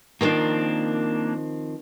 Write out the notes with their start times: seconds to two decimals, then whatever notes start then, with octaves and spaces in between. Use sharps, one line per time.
0.21 D#3 F3 A#3 C4 D4